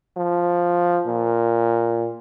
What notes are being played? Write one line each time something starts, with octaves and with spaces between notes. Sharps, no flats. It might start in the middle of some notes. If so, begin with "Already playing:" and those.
F3
A#2